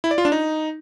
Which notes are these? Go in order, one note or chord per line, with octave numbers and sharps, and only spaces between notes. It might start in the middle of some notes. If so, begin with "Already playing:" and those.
E4
D5
F4
D4
D#4